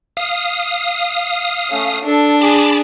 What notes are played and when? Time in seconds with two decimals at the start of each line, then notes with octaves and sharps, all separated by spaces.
0.17 F5 D#6
1.71 A3 C#4
2.04 D4 A4
2.41 G#4 A5 B5 D6